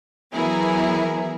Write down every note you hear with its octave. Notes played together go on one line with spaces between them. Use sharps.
E3 F#3 B3 E4 G#4 A#4